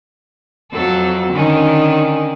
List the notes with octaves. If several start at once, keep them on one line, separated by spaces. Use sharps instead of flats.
F2 F#3 A4
D3 D#3 C#4